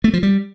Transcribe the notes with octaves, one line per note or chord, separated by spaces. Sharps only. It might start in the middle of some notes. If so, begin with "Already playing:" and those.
A3
F3
G3